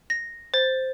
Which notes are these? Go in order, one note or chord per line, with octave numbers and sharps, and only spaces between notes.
A#6
C5 A6